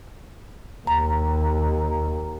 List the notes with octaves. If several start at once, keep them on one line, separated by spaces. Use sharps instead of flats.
D#2 A#5